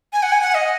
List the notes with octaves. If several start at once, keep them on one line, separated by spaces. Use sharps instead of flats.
G#5
F#5
G#5
F#5
D#5